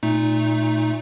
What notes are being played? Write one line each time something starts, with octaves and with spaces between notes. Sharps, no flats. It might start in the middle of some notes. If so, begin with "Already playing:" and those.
A#2 A3 D#4